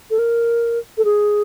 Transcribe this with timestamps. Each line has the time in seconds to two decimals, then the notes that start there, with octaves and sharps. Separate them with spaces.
0.10 A4
0.19 A#4
0.98 A4
1.05 G#4